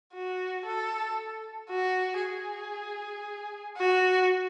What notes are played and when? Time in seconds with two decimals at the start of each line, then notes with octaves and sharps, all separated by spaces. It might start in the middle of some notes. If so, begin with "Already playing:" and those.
0.14 F#4
0.65 A4
1.70 F#4
2.21 G#4
3.77 F#4